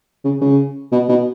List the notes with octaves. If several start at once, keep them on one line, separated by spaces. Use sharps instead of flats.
C#3
C#3
B2
B2